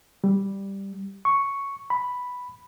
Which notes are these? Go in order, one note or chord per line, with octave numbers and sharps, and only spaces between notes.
G3
C#6
B5